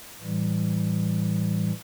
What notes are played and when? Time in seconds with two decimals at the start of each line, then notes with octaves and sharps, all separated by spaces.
0.20 A2 E3 G3